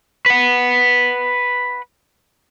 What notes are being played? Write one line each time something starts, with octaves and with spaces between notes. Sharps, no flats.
B4 F#5